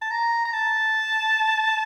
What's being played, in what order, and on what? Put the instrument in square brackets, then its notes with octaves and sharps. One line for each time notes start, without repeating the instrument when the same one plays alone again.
[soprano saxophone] A5
A#5
A#5
A5